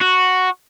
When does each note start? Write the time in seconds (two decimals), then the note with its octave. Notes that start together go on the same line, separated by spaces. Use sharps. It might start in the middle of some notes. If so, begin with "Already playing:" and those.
0.01 F#4